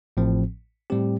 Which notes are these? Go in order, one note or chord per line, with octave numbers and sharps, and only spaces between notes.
A1 A2 F3 C4
A2 G3 C4 G4